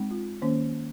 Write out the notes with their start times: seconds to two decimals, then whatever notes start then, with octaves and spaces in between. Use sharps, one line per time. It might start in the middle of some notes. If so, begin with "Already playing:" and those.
Already playing: G#3 C4 D#4
0.11 F4
0.42 D#3 A#3 C#4 C5